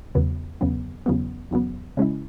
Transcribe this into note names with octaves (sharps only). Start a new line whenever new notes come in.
E2 C#3 F#3 B3
E2 C#3 F#3 B3
E2 C#3 F#3 B3
E2 C#3 F#3 B3
C#3 G#3 C#4 E4